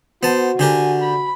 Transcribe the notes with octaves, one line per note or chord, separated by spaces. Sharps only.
B3 F#4 C5 A5
D3 G4 A#4 G#5
B5